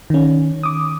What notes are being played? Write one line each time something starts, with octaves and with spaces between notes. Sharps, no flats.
D#3 C#4
D6 D#6